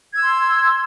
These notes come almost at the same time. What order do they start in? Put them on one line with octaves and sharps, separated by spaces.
G#6 E6 C6